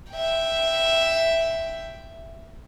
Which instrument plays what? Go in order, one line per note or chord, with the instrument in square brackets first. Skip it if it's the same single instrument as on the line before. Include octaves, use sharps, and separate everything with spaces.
[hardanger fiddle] E5 G5